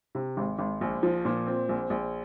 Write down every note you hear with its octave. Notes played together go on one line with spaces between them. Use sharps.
C3
G#1
G#1
A#1
F3
A#2
C4
A#1
A#1